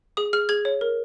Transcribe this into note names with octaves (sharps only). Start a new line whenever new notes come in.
G#4 D#6
G#4 F6
G#4 G#6
C#5
A#4